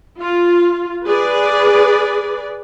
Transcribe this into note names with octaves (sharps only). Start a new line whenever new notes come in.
F4
G#4 B4 D5